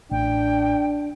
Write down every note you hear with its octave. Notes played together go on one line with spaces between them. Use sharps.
A1 D4 G5